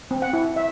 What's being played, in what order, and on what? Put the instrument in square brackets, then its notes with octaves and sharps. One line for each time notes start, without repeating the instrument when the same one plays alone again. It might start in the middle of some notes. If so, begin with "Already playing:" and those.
[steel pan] C4
F#5
E4
E5